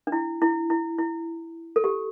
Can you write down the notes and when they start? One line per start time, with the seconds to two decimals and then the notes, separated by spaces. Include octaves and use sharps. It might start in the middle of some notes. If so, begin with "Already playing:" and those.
0.07 D4
0.12 E4
0.42 E4
0.70 E4
0.98 E4
1.76 A4
1.84 G4